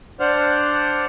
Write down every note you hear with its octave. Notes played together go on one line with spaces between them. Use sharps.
D4 C5 D5 F#5 F6